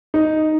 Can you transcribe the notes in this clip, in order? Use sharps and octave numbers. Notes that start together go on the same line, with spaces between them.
D#4